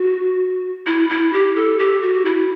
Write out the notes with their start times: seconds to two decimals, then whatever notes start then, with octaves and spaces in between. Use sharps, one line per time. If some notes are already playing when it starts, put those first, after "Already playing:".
Already playing: F#4
0.87 E4
1.09 E4
1.33 G4
1.56 A4
1.79 G4
2.02 F#4
2.25 E4